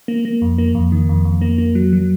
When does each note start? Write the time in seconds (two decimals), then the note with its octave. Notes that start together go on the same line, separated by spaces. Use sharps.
0.08 A#3
0.25 A#3
0.42 F2
0.58 A#3
0.75 F2
0.92 D#3
1.09 F2
1.25 F2
1.41 A#3
1.58 A#3
1.75 F#3
1.93 F#3